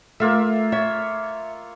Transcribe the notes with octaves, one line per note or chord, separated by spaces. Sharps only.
A3 A#3 F4 E5
C#5 E5